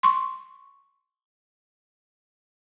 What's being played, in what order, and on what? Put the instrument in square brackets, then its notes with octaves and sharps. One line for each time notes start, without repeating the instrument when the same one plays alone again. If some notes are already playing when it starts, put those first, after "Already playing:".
[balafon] C6 C#6